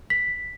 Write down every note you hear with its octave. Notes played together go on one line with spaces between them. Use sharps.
B6